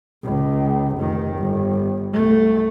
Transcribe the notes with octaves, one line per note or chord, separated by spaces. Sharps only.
C#2
F1 D#3
G1
C2 A3